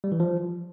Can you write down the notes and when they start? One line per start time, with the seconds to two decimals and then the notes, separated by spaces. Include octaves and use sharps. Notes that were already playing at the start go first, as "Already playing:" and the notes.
0.04 G3
0.12 E3
0.20 F3